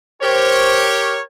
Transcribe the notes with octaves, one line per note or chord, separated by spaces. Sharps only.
G4 A#4 C5 C#5